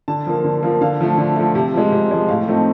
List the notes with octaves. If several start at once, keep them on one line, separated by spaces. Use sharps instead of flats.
D3 A5
F3 A#3
D3
F3 A#3
D3 F5
F3 A3
D3
F3 A3
C3
F3 G#3
C3
F3 G#3
A2 F5
F3 A3 C4 D#4